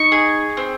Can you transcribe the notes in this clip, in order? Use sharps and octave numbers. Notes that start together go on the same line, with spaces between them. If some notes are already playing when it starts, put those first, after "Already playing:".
Already playing: D#4 C#6
G#4
C4